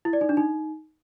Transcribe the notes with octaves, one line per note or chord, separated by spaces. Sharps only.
E4
D5
D#4
D4
D#4